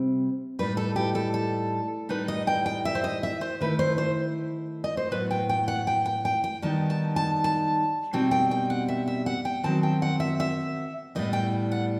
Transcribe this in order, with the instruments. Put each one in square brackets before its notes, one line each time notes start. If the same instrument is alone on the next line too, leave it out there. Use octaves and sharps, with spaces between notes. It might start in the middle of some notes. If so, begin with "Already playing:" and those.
Already playing: [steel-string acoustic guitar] C3 G3 C4
A2 G3 D#4 B4
A4
G4
A4
A4
A2 G3 D#4 B4
D#5
G5
G5
E5
C5
D#5
E5
C5
D#3 A3 E4 B4
C5
C5
D#5
C5
A2 F#3 B3 B4
G5
G5
F#5
G5
G5
G5
G5
D#3 G3 B3 D#4 A5
A5
A5
A5
B2 G3 C4 D#4 G5
G5
G5
F#5
E5
E5
F#5
G5
D#3 F#3 C4 A5
G5
F#5
E5
E5
A2 G3 B3 D#5
G5
F#5